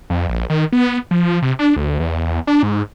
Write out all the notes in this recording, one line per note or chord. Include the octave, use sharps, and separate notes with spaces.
F2
A#1
D#3
B3
F3
C3
D4
D2
E2
D4
G#2